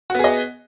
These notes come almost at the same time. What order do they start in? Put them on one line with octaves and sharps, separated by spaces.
F#4 B3 G#4 D#5